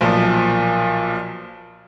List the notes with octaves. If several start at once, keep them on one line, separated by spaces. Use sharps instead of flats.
B1 A#2 F3